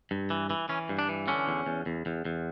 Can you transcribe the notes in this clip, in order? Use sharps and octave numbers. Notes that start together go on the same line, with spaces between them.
G2
E3
E3
E3 C#4
G2
D4
E3
D3 C#4
E2
E2
E2
E2
E2